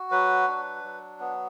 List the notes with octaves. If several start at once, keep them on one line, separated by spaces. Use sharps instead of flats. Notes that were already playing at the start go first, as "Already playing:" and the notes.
Already playing: F#4
F#3 B4
D4
F#3
B3